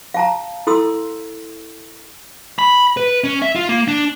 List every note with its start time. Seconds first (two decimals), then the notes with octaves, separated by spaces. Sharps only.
0.14 F5 A5 A#5
0.67 E4 A4 C6 D#6 E6
2.59 B5
2.97 B4
3.24 C#4
3.42 E5
3.55 F4
3.69 A#3
3.88 D4